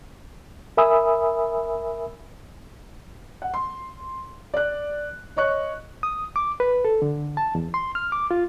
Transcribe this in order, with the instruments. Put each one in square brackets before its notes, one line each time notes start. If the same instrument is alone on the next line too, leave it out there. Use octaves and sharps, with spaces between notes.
[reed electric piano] A#4 E5 G#5 B5 D#6 E6
[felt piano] F#5
C6
D5 F#6
C#5 D#5 C#6 F#6
[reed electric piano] D#6
D6
B4
A4
D3
A5
E2
C6
F6
D6
F4